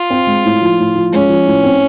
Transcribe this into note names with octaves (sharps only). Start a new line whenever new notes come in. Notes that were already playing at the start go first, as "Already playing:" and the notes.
Already playing: F4
C4
G#3
A2
F3
A2
F3
G#3 C#4
F3
A2
C4